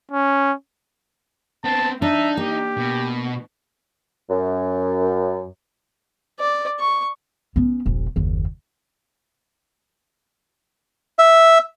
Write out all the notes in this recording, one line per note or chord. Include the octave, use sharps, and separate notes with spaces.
C#4
B3 C4 A5
D4 D#4 E5
A#3 G4
B2
F#2
D5
C#6
B3 C#4
E1 A#1
F#1 D#2
E5